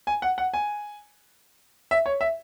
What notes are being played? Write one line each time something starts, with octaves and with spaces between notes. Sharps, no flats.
G#5
F#5
F#5
G#5
E5
C#5
E5